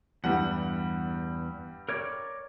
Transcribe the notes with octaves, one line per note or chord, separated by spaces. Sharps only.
E2 G2 G3 F#5
A#4 C#5 D5